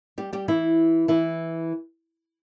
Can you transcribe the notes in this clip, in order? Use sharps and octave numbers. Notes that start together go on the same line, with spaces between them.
G3 G4
G3 G4
E3 E4
E3 E4